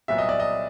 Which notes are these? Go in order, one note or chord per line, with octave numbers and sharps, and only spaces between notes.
C2 A#2 F#3 B3 E5
D#5
D5
D#5